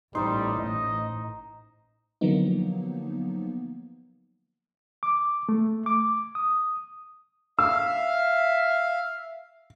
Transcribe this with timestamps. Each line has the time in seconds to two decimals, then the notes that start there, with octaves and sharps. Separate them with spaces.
0.15 A1 G3 D#4 C5 C6
0.58 A2 D#5
2.21 D3 F3 F#3 A#3 B3 D#4
5.03 D6
5.49 A3
5.86 D6
6.35 D#6
7.59 E5 F5 E6